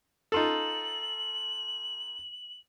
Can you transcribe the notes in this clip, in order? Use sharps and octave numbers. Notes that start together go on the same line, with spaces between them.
D#4 F4 A4 F#7